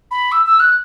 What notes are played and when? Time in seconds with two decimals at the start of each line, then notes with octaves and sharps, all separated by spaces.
0.11 B5
0.32 E6
0.46 E6
0.60 F#6